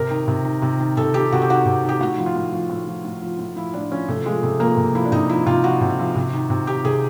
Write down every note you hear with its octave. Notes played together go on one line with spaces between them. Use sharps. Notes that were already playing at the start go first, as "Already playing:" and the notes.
Already playing: C3 A#4
D#3
C3
D#3
C3
D#3
C3 A4
D#3 G4
C3 F#4
G4
D#3 F#4
C3
D#3
G4
A2 F#4
F3
F4
A2
F3
A2
F3
A2
F3
A2
F3 E4
A2 D4
F3 C#4
C3 A3
F3 G#3
C3 A3
F3 A#3
C3
F3 E4
D4
C3 D#4
F3 E4
C3 F4
F3 F#4
C3
F3
C3
D#3
C3
D#3 G4
C3 G#4